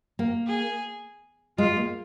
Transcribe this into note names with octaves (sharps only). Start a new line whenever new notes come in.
A#3
G#4
G#3 F4
A#3